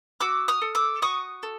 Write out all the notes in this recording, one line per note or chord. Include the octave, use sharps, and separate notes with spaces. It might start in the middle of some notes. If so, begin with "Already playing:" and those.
F#4 D6 E6
D#6 F6
A4
D6 E6
F#4 C#6 D#6
A4